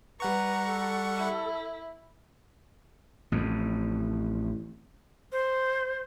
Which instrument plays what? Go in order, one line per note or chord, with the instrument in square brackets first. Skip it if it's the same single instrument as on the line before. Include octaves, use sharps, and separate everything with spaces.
[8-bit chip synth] G3 F#5 C#6 [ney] B4 [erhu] A#5
[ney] A4
[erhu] E4
[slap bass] A1 F2
[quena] C5